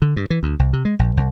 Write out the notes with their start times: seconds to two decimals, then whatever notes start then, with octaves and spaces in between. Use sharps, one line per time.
0.02 D3
0.16 G2
0.30 E3
0.43 D2
0.59 C2
0.73 C3
0.85 G#3
0.99 A#1
1.17 C2